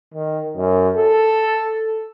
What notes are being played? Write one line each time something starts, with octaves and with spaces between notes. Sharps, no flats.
D#3
F#2
A4